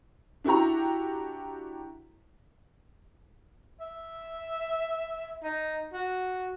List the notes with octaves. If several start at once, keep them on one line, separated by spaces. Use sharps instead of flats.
D4 E4 F#4 G4 A#5
E5
D#4
F#4